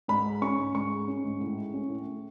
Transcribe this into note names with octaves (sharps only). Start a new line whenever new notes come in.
G#2 B5
G#3
C#4 C#6
G#2
G#2 C#6
G#3
C#4
G#2
A2
G#3
C#4
A2
A2